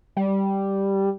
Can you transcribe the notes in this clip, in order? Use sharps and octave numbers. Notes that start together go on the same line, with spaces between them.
G3